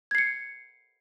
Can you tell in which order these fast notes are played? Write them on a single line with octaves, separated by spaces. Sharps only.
G#6 C7 C#7